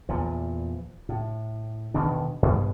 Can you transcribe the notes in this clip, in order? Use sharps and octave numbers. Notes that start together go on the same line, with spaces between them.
E2 A#2 F3
A2
E1 B2 D#3 D4
G2 B2